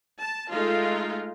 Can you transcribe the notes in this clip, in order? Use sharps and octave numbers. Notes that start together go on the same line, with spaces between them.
A5
G#3 A3 D#4 F4